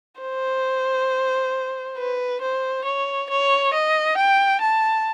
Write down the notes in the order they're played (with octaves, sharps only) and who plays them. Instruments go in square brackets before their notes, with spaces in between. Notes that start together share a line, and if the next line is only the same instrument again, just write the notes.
[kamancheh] C5
B4
C5
C#5
C#5
D#5
G5
A5